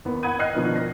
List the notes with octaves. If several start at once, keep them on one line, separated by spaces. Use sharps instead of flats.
D#2 B3
F#5 B5 D#6 G#6 D#7
D#5 G5 F6 F#6 C7
B2 D#3 F3 B3 D4 A#4
A#6